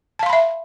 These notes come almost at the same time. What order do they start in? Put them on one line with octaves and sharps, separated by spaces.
A5 F5 C6 B5 E5